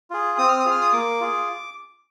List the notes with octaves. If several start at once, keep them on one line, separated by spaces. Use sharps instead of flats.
F4 G#4
C4 D#6
F6
D#6
F4 G#4
F6
D#6
A#3 D6
F4 G#4